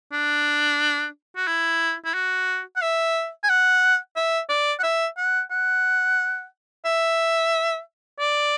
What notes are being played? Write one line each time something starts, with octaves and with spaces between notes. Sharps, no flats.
D4
F#4
E4
E4
F#4
F#5
E5
G#5
F#5
E5
D5
F#5
E5
F#5
F#5
E5
D5